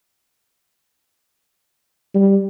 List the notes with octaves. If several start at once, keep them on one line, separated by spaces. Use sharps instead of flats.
G3